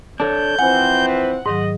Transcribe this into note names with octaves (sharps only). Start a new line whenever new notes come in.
D4 A4 C#5 G6
E3 F3 C4 F#5 G#5
B4
G#2 D#3 F#3 D#5